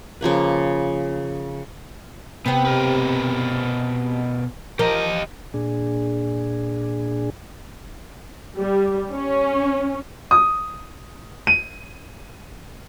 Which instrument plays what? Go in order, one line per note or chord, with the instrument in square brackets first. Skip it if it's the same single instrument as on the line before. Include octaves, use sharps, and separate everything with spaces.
[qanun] C#3 F3 A#3 B4
[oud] C3 C4 [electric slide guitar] B3
[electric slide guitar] B2 A#4 B4
[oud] F3 A#4 [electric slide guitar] G4 D#5
[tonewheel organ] A#2 D4 G#4
[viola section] G3
C#4
[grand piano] D#6
D#7